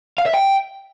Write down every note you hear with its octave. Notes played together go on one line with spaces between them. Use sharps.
F5
E5
G5